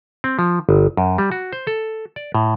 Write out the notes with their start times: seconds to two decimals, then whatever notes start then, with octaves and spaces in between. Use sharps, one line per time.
0.24 C4
0.39 F3
0.69 G1
0.97 F#2
1.18 G3
1.32 F#4
1.53 C5
1.67 A4
2.16 D5
2.35 A2